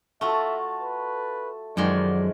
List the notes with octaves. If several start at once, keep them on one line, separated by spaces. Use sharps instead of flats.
A3 F4 F#4 A4 E5 A5
B4
F#2 D#3 F3 G#3 D5